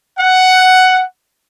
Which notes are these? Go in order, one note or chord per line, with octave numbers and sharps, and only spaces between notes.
F#5